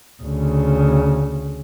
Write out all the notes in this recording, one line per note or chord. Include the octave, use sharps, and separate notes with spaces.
D2 C#3